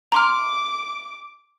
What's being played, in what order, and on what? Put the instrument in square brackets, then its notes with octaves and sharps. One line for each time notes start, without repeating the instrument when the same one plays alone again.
[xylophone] A#5 C6 F6 [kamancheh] D6